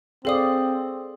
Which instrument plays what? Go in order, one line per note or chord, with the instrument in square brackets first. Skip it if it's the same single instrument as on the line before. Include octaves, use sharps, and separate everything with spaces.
[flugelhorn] C4 [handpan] G#4 D5 [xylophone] A4 F5 D#6